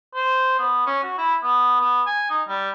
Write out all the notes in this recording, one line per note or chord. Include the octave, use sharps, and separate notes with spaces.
C5
B3
C#4
F#4
E4
B3
B3
G#5
D#4
G3